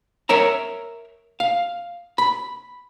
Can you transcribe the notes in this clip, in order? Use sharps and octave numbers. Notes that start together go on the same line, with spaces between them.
A#4 C#5 E5 A#5
F5
B5